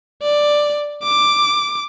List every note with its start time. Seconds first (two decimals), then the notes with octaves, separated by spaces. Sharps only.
0.22 D5
1.03 D6